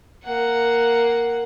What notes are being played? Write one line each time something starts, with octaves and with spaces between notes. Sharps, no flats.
A#3 F#5